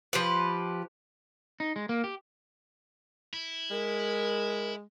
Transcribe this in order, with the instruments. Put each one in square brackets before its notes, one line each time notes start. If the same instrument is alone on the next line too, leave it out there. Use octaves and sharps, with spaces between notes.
[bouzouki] F3 G4 B4
[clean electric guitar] D#4
G#3
A#3
G4
[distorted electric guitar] E4
[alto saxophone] G#3 [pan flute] A#4